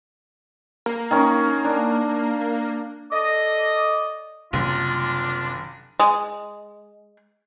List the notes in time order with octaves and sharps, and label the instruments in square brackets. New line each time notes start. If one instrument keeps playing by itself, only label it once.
[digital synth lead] A#3
[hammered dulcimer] D#3 C#4
D4
[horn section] A4 D5 D#5
[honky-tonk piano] F#1 [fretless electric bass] C3 D#3 G3 [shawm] D4 [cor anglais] F4
[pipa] G#3